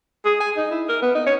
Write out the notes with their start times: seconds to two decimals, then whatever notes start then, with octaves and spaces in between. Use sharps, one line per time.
0.25 G#4
0.40 G#5
0.57 D#4
0.71 E4
0.89 A#4
1.02 B3
1.15 D#4
1.26 C#5